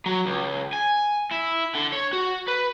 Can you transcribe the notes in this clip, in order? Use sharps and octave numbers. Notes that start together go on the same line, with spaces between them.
F#3
C#2
G#5
E4
D3
C#5
F#4
B4